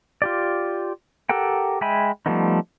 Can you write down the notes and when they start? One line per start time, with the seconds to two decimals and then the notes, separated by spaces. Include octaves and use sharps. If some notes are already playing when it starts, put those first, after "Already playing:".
0.22 F4 G4 D5
1.29 G4 A4 A#4 F#5 G5
1.81 G#3 E5 G5 G#5 B5
2.26 F3 G3 A3 B3 D#4